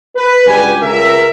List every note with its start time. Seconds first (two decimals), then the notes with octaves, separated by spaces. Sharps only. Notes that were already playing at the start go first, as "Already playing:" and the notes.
0.16 B4
0.46 C#2 G2 G3 F#4 G4 G#5
0.82 C#2 A#4 E5